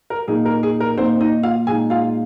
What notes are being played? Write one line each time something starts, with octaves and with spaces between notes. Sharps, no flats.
A#4
A#2 A#3 D#4 G#4
A#4
G#4
A#4
A#2 A#3 C4 D#4 C5
D#4 D#5
F4 F5
A#2 G#3 D#4 G#4 G#5
F4 F5